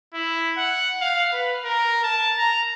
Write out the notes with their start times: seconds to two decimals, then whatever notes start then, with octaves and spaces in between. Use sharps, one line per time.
0.14 E4
0.57 F#5
1.01 F5
1.33 B4
1.65 A#4
2.03 A5
2.38 A#5